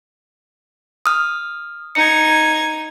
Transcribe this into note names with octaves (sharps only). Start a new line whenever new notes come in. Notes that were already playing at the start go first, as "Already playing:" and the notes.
D#6 F6
D#4 G#6 C#7